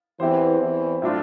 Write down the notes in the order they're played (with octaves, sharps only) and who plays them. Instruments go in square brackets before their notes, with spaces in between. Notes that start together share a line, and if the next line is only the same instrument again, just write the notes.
[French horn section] E2 E3 [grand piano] C4 E4 G4 C5
[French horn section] E2 E3
[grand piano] A2 F#3 A3 D4 F4